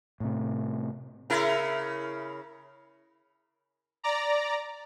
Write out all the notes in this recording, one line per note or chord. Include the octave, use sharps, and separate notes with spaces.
A2 C3
C#3 E4 A#4
D5 A#5